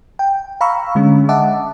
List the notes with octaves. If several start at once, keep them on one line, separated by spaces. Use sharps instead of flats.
G5
F5 A#5 B5 C#6 E6
D3 G#3 C#4
D#5 E5 F#5 A5 D6